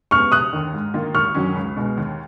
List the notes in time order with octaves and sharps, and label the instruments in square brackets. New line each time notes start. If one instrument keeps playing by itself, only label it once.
[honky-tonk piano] C#3 G#3 B3 [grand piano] C#6 F6
[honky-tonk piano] F1 [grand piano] D#6 F#6
[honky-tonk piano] D#2 D#3
G#2
D#3 A#3 F4
[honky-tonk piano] G#1 [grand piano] C#6 F6
[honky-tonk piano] F#2 D#3 F#3 C#4
C#2
B2 G#3
D#2